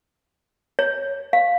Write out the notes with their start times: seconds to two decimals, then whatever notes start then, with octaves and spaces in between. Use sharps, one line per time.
0.79 C#5
1.33 F5